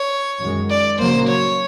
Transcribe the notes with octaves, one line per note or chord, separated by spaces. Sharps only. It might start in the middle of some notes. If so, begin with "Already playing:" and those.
Already playing: C#5
F#2 D#3 G#3
D5
C#3 F#3 A#3 C5
C#5